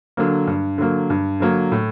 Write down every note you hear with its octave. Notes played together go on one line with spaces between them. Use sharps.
D3 F#3 A#3
G2
D3 F#3 A#3
G2
D3 F#3 A#3
A2